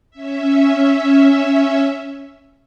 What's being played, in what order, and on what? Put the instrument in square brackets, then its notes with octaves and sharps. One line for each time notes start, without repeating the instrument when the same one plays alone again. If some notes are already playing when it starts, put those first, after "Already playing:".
[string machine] C#4 E5